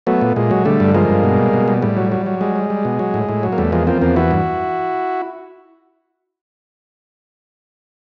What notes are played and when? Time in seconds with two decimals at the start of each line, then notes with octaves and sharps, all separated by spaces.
0.07 F#3 A3 B3
0.21 A#2
0.36 A#2 G#3
0.51 F#3
0.65 D3 G3 A3
0.80 G2
0.94 F3 G#3 A#3
1.09 G2
1.24 B2
1.38 G3
1.53 B2
1.68 G3
1.82 A2 G3
1.97 F#3
2.12 F#3
2.26 F#3
2.41 G3 G#3
2.56 G3
2.70 G3
2.85 B2
2.99 F#3
3.14 A2
3.29 A2
3.43 F#3
3.53 A#3
3.58 E2 G3 A3
3.72 F3 G#3 A#3
3.87 F3 A#3 C4
4.02 E2 A#3 C4
4.16 E3 E4 F#4
4.31 G2